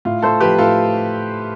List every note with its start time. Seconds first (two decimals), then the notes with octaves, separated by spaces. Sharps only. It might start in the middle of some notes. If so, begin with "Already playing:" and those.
0.05 A2 F4
0.22 A3 A4 C5
0.40 F3 G4 B4
0.59 A2 F4 A4